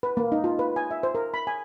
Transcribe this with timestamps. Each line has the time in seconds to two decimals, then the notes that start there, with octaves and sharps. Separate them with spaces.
0.03 B4
0.17 A#3
0.32 D#4
0.44 F4
0.59 B4
0.76 G#5
0.91 E5
1.03 C5
1.15 A#4
1.34 B5
1.47 G#5